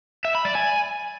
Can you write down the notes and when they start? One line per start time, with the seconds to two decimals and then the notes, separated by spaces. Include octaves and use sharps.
0.25 E5
0.35 B5
0.45 D5
0.55 G#5